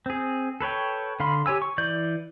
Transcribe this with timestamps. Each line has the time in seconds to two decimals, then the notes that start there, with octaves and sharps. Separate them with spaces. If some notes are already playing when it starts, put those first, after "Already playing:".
0.06 C4 G#4
0.61 A4 B4 C#5 G5
1.20 D3 F5 B5 C6
1.46 G4 C#5 G#5 E6
1.62 C#6
1.78 E3 D5 G6